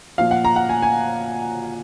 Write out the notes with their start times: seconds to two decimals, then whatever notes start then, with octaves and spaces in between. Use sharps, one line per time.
0.18 A#2 F3 F5
0.31 F#5
0.44 A#5
0.56 F#5
0.69 G#5
0.82 G#5